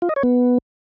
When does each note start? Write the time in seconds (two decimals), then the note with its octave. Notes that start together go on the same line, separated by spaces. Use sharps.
0.02 F4
0.09 D#5
0.16 C#5
0.23 B3